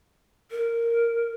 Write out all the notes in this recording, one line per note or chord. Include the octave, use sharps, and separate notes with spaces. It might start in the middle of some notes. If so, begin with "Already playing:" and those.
A#4